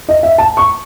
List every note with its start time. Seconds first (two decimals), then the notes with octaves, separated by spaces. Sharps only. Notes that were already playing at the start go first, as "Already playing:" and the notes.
0.09 D#5
0.23 E5
0.38 A5
0.57 C#6